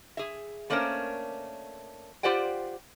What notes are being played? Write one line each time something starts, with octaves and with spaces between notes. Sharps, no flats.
G#4 E5
A3 A#3 C#4 D4 A#4 C5
F4 G4 C5 D5 F#5 G5